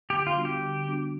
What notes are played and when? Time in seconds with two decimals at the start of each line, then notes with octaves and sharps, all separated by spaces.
0.10 D3 G4
0.27 F4
0.35 G3 B3 D4 F#4
0.45 G4
0.62 D3
0.87 G3 B3 D4 F#4